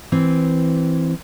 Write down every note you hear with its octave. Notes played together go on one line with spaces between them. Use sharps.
E3 C4